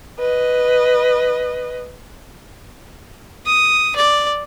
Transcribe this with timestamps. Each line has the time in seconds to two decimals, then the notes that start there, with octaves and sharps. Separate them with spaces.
0.19 B4 D#5
3.46 D#6
3.96 D5